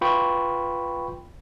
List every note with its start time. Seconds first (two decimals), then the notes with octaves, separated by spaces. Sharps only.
0.01 F4 B4 G5 B5 C#6